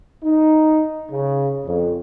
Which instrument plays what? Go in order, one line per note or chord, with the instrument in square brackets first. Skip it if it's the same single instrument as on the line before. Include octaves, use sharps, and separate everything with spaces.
[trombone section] D#4
C#3
F2